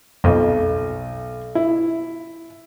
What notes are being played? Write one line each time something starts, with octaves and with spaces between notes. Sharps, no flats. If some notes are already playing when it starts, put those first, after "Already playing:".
B1 F2
E4